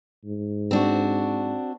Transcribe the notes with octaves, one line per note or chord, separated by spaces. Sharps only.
G#2
C4 D4 F#4